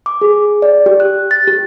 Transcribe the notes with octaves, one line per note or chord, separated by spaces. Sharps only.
D6
G#4
D5
G4
F#6
A6
G4